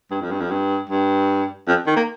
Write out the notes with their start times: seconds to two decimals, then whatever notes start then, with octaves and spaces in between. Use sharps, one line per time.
0.11 G2
0.21 F2
0.31 G2
0.40 F2
0.51 G2
0.90 G2
1.67 F2
1.87 D#3
1.96 A#3